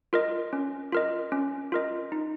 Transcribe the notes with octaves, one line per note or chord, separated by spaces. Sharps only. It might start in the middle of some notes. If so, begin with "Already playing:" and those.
F4 A#4 D#5
C#4
F4 A#4 D#5
C#4
F4 A#4 D#5
D#4